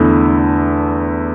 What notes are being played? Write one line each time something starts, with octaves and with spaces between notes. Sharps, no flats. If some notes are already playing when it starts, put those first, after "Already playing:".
Already playing: E2 D3 A3 E4